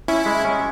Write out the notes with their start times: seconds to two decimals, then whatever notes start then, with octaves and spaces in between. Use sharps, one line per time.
0.08 C#4 E4
0.26 G#3
0.45 C#4